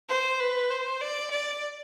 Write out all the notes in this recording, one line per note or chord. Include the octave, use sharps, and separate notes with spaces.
C5
B4
C5
D5
D5